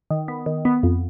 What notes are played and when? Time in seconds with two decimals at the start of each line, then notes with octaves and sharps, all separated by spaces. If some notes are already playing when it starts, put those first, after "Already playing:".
0.11 D#3
0.28 B3
0.46 D#3
0.65 B3
0.83 F2